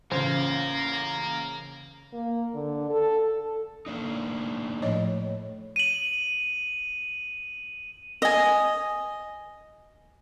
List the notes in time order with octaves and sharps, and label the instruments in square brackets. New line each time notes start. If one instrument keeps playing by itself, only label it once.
[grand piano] A1 F4 [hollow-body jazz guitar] C#3 C5 [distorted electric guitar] A#4 F5
[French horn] A#3
D3
A4
A4
[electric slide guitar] A#3 D4 D#4
[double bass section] A2 [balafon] F3 C#5 D#5
[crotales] D#7 F#7
[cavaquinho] D#5 G#5